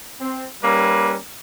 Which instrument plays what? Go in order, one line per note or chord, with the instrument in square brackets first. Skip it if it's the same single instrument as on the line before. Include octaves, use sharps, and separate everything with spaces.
[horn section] C4
G3 A#3 C#4 B4